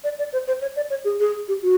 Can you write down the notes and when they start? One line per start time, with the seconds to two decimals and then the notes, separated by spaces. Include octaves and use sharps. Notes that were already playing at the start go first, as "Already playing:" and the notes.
0.04 D5
0.19 D5
0.33 C5
0.47 C5
0.62 C#5
0.76 D5
0.90 C#5
1.05 G#4
1.20 G#4
1.48 G4
1.62 F#4